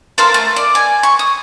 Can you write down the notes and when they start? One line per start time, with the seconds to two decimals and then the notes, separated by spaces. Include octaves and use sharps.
0.18 A4 A#4 C5 F5
0.34 A3
0.56 D5
0.75 G#5
1.03 C#6
1.19 D#6